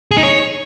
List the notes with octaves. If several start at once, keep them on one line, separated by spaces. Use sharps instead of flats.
G#4
D#4
C#5